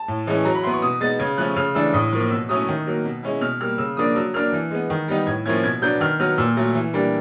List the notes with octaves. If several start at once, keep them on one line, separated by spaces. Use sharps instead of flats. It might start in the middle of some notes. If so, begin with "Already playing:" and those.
Already playing: A5
A2
E3 G#3 C#4 E4
F#3 A#5
B5
B3 E4 C6
C#6
B2 D#6
G#3 B3 D#4 A6
C#3 G#6
F3 A3 C#4 F#6
C#3 F6
E3 A3 D4 E6
A2 D#6
F3 A#3
B2 E6
F#3 A3 C#4 E4 D#6
D#3
F#3 A#3
B2
G#3 C#4 E4
B2 F6
G3 A#3 F6
C#3 E6
F3 A#3 D4 D#6
F#3 E6
A#3 D4 F6
E3
G#3 B3
D#3
G3 B3 D#4
A2 G#6
F3 A#3 C#4 E4 G#6
B2 G#6
F#3 B3 D4 G6
D#3 F6
F#3 B3 F6
A#2 E6
F#3 A3
E3
G3 A#3 D4